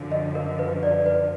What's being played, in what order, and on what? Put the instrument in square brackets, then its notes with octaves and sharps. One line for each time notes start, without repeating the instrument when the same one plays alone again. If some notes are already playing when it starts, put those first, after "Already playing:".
Already playing: [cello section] F#2 D3 F3
[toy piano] D#5
A#4
B4
D5
B4